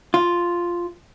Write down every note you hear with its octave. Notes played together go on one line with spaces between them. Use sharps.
F4